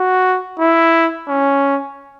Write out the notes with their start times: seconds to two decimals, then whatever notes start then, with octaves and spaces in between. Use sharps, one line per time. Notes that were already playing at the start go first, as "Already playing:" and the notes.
Already playing: F#4
0.59 E4
1.28 C#4